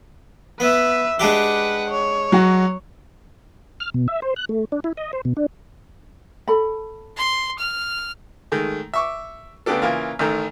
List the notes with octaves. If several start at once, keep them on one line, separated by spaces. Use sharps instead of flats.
B3 B4 E5
G#3 D4 G4 B4 F#5
C#5
F#3 F#4
F6
B2
E5
C5
F#6
A3
D4
E4
D#5
C5
B2
D4
A4 B5
C6
F6
D#3 G#3 A3
E5 C#6 D6
C#3 A3 B3 D4 G4 A4
C#3 E3 A#3 F4
A1 D#3 A3 A#5